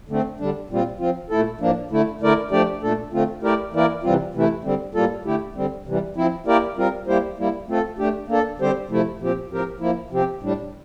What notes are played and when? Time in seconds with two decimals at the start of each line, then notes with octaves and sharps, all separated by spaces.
0.08 D3 A3 C4
0.39 D3 G3 D4
0.69 A#2 G3 C4 F4
0.99 F3 C4 F4
1.30 A#2 A3 E4 A4
1.60 A2 F3 A#3 D4
1.90 D3 A3 E4
2.21 D3 A3 E4 A#4 D5
2.51 F3 A3 D4 G4 D5
2.82 A#2 A3 D4 A4
3.13 D3 A3 C4 F4
3.43 A3 E4 G4 A#4 D5
3.73 E3 A#3 E4 A#4 D5
4.03 C3 E3 G3 C4 F4
4.34 C3 E3 A3 E4
4.64 D3 G3 C4
4.95 A2 G3 A#3 F4 A4
5.24 D3 A3 E4 G4
5.56 D3 G3 C4
5.85 C3 E3 G3
6.16 F3 C4 E4
6.46 A#3 E4 G4 A#4 D5
6.77 G3 C4 F4 A#4
7.07 G3 A#3 E4 G4 C5
7.38 G3 A#3 E4
7.68 A3 C4 F4 A4
7.99 A3 D4 G4
8.28 A#3 D4 A4
8.59 D3 G3 C4 G4 C5
8.89 C3 F3 A3 E4
9.20 A#2 F3 C4 G4
9.51 A2 F3 C4 G4 A#4
9.80 F3 A#3 E4
10.10 C3 F3 C4 G4
10.41 A2 G3 D4